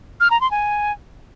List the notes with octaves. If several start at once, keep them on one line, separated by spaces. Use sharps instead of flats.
F6
A#5
C6
G#5